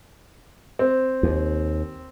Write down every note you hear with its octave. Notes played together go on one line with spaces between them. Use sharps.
C4
D#2